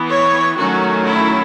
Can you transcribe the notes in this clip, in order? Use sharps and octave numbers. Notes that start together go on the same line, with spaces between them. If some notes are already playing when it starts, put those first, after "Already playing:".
Already playing: E3 B3
C#5
D#3 F#3 A3 C#4 F#4
E4